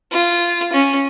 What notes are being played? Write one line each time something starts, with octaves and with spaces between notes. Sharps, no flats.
F4
C#4